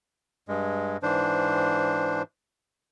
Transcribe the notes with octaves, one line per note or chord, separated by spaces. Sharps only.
G2 G#3
G#2 E3 D4 C5